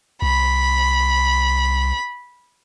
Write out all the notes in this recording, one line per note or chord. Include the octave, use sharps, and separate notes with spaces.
C2 B5